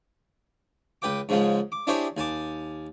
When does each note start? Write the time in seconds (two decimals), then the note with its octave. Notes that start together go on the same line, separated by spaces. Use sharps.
1.02 C#2 B4 G5 D6
1.29 G#2 C#3 F3 G#3
1.72 D6
1.87 D4 E4 G4 G#4 C5 C#5
2.17 D#2 G#5 A5 D6